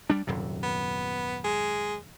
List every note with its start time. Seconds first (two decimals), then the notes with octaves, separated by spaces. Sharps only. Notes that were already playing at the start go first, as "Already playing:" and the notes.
0.10 G3 D4
0.27 D#1 F#2 C3
0.63 B3
1.44 G#3